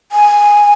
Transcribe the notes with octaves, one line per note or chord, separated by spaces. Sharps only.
G#5